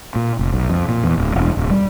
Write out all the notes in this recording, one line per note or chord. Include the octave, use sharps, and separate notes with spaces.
A#2
F1
B1
F2
A#2
E2
D1
E1
D1
G3